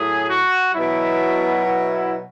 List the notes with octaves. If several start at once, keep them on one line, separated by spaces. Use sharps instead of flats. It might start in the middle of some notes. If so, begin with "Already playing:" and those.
Already playing: A2 F#3 G#4
F#4
B2 F#3 E4
E4